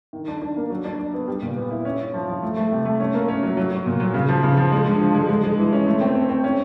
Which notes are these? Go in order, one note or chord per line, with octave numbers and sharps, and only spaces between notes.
D#3
D4
D4
A#3
F#3
D4
D4
B3
G3
A#2
B3
E4
C#4
C#4
F3
F3
A3
A3
C3
A3
C#4
A#3
C#4
F#3
F#3
F#3
A#2
F#3
C#3
F3
C#3
F3
G#3
D3
F3
G#3
G#3
G#3
E3
C#4
A3
C4
C4
C4
C#4